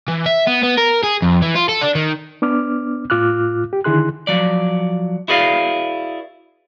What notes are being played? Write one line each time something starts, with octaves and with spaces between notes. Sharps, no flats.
E3
E5
B3
B3
A#4
G#4
F2
E3
F4
A4
D4
D#3
B3 D4 D6 F6
A2 F4 D6 F6 F#6
G4
D3 D#3 E4 G#4 C6 F#6
F3 F#3 D5
E4 F#4 G#4 B4 D5 F5